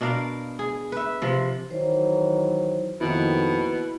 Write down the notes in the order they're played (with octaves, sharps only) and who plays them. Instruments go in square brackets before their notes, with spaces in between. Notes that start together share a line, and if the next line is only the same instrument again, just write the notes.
[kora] B2 D4 A#4 F5
G#4
B4 E5
C3 F3
[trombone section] D#3 E3 F#3 [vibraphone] C5
[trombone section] F2 D#3 [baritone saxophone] B2 [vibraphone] A#3 B4 [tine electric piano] E4